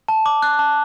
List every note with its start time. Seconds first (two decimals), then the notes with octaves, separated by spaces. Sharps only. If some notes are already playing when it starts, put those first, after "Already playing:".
0.09 A5
0.26 D6
0.42 F#6
0.59 A5